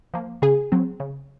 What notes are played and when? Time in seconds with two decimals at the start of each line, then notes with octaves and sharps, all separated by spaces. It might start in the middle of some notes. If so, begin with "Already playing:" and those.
0.14 F3 A#3
0.42 C#3 G#4
0.72 F#3 C4
1.00 C#3